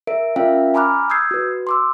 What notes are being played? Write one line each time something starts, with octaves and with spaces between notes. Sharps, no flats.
A#4 E5 D7
C#4 F4 A#4 E5 F5 G5
G#5 A#5 B5 D6 F6 F#6
D#6 E6 G6 G#6 C7
F#4 B4
C6 D6 E6